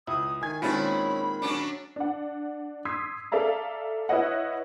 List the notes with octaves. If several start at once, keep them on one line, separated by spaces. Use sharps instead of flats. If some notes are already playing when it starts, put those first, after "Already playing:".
C#2 E4 D#6
D#3 G#5 G#6
A#2 D#3 G#3 C4 C#4 E4 A5 B5
F#3 C#4 D4
D4 F#5
C6 D#6 E6 G#6 B6 C7
A4 D5 E5 F5 A#5
E4 B4 C#5 D#5 F#5